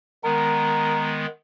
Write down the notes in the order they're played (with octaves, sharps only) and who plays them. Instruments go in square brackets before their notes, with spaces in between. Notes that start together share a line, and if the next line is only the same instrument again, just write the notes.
[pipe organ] D#3 G#3 B3 [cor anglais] A#4